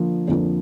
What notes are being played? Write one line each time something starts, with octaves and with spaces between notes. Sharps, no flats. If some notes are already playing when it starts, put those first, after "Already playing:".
Already playing: D3 F3 A#3
F2 D3 F3 A#3